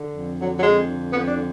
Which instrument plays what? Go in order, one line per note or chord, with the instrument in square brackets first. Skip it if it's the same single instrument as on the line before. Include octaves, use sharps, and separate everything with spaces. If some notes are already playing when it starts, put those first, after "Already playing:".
Already playing: [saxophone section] D3
F2
D3 F#3
F#3
F2 G#3
D3
F2 B3
D4
D3